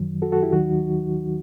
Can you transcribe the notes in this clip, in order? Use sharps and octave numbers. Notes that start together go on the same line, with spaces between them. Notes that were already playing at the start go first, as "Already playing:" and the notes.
Already playing: F#2 D#3 F#3
F#4 A4
F#4 A4
E4 G4
D#2 D#3 F#3 D#4 F#4